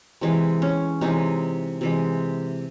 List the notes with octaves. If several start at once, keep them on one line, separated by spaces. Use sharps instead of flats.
C3 E3 G#3
C#4
C3 E3 G#3 D#4
C3 E3 G#3